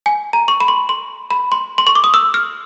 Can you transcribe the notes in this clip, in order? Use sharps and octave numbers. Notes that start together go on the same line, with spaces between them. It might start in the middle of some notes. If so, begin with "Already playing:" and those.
G#5
A#5
C#6
B5
C6
C6
B5
C6
C6
C#6
D6
D#6
E6
F6